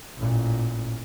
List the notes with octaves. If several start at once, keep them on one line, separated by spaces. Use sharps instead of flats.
A1 A#2